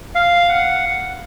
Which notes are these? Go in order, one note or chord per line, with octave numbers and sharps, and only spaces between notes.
F5
F#5